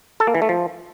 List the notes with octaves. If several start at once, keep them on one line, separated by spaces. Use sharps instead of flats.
A4
A#3
E3
A3
F3